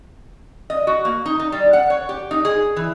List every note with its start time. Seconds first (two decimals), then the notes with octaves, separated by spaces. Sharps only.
0.70 D#5
0.87 F#4
1.05 A#3
1.26 D#4
1.40 D#4
1.52 G3
1.73 F#5
1.90 C#5
2.09 G4
2.31 D#4
2.45 G#4
2.76 E3